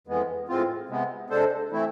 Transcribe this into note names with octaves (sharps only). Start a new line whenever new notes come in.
F2 E3 G#3 B3
A2 G#3 C4 F4
C3 G#3 B3
C3 G#3 D4 A4 C5
E3 A3 C4 E4